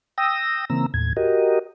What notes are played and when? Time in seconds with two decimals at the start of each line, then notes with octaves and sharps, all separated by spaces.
0.18 G5 D#6 E6 A#6
0.70 C#3 E3 A#3 C4 A#5 E6
0.94 D#2 A2 G#6
1.17 F#4 G4 A#4 D#5